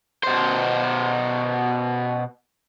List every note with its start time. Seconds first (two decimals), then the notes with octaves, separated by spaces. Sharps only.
0.24 B2 C5